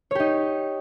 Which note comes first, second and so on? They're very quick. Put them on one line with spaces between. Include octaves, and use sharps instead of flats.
C#5 G4 D#4